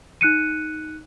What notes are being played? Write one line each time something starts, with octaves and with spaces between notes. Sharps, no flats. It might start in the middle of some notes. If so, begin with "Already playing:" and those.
D#4 F#6 C#7 D#7